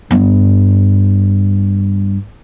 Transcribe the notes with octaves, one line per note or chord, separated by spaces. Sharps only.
G2 B3